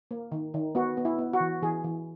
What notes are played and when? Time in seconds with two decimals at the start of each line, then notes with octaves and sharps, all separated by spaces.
0.11 A#3
0.32 D#3
0.54 D#3
0.75 B3 F#4
0.97 B3
1.05 E4
1.18 B3
1.33 F#4
1.40 E3
1.62 E3 G#4
1.84 E3